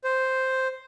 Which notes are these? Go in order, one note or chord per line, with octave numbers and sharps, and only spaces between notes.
C5